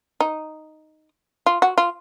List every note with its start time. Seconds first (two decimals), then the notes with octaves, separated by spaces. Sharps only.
0.20 D#4
1.46 F4
1.62 F#4
1.78 F4